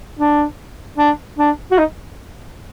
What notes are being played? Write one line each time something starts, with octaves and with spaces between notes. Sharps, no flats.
D4
D4
D4
F#4
D#4